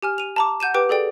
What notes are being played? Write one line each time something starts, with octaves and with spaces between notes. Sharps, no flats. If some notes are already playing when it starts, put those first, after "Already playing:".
G4 G#5 F6
D#7 F7
A5 A#5 D6
F#5 G6 D#7 E7
G4 B4 G5 D6
G#4 A4 D5 G5